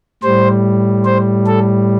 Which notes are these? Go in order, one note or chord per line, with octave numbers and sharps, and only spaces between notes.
A2 G3 C5
C5
A4